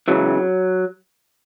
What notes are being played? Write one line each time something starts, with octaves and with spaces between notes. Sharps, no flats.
C#2 C#3 E3 F#3